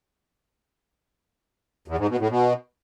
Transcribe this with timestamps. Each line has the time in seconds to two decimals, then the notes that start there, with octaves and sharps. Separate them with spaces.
1.88 E2
1.98 G#2
2.09 B2
2.19 A2
2.30 B2